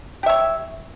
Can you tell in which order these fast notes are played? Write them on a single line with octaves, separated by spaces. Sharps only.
G4 E5 C#5